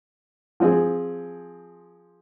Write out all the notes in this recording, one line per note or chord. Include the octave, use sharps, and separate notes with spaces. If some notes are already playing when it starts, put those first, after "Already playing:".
F3 C4 G#4